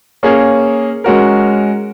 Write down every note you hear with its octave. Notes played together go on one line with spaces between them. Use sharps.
A#3 C#4 G#4 C#5
G#3 C#4 F#4 A#4